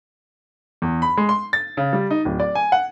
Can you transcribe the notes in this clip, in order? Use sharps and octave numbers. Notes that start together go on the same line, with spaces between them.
E2
B5
G#3
C6
A6
C#3
G3
D#4
D1
D5
G#5
F#5